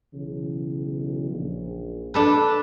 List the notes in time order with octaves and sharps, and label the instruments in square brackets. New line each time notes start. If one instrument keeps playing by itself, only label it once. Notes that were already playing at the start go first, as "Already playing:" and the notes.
[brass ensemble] B1 C#3 E3
A#1
[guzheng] D4 A4 B4